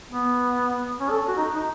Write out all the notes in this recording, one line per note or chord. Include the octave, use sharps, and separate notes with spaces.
B3
C#4
A4
F#4
D#4
D#4